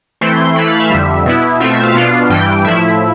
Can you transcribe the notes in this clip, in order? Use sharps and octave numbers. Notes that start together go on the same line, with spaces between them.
E3 A3 C4 E4 C6
E3 A3 E4 B5
F5
E5
F2 D3 G3
B2 B3 E4
B2 A3 C4 F4 E5
E5
F5
B2 B3 D4 F4
G2 E3 G3 G5
A2 F3 A3 E4 E5